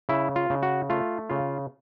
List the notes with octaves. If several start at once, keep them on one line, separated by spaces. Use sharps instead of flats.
C#3 E4
F4
C#3
F#4
A3 F4
C#3 F4